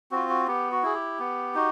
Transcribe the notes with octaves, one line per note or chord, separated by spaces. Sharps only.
C4 F4 F#4
F#4
B3 G4
F#4
E4 G#4
G4
B3
D#4 F#4